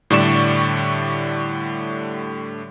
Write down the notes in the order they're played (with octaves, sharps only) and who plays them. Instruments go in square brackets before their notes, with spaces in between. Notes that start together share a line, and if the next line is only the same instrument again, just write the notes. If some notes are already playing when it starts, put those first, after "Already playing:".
[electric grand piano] A2 D3 G3 D5 C#6 E7